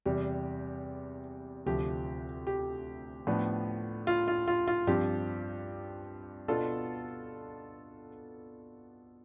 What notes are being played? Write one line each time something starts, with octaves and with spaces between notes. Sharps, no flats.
E2 C3 G3 G4
D2 C3 F3 G4
G4
A2 F3 B3 D4
F4
F4
F4
F4
G2 F3 C4 G4
B2 B3 D4 F4 A4